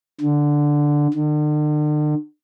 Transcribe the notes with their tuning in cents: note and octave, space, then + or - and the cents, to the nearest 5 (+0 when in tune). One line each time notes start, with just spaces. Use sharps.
D3 +0
D3 +40